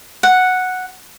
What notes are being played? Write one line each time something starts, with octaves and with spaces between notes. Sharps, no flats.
F#5